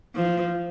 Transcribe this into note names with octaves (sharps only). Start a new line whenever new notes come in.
F3